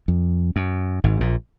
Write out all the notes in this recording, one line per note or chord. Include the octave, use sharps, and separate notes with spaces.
F2
F#2
G#1 G#2
A#1 A#2